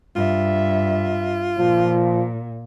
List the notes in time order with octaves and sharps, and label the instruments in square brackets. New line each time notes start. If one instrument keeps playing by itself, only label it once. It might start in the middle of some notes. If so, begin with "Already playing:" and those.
[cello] G2 E5 [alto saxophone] F4
[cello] A#2 [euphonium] F3